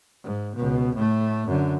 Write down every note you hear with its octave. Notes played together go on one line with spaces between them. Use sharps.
G#2
C#2 B2
A2 A3
F#2 D3